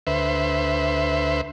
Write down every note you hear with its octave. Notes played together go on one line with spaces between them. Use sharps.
D2 B4 C5 E5